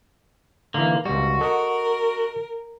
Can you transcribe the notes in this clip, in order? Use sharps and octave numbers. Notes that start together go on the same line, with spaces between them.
D3 E3 A#3
C#2 G3 F#4
A4 A#4 D#5 F#5